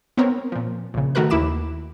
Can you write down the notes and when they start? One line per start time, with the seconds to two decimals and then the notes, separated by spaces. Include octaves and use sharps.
0.17 B3 C4 A#4 C#5
0.52 A#2 F3
0.94 A#1 C#3
1.15 D#3 A3 F#4 A#4 B4 F#6
1.30 D#2 E4 B5 D6 E7